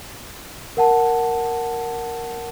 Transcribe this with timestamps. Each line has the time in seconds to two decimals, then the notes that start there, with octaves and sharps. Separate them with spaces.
0.77 A#4 F#5 A5